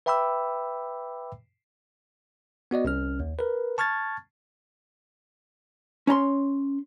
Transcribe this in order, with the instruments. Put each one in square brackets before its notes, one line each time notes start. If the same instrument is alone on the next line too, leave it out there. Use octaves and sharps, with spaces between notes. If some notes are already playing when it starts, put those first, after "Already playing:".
[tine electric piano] B4 E5 G5 B5 D6 E6
B3 F#4 D5 D#5
C2 C#4 F6
D#2
A#4 B4
A5 C#6 F6 G#6 A6
[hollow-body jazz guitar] C#4 C#5 A#5 C6